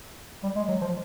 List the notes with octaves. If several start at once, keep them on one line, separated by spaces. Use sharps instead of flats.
G3
G#3
F#3
F3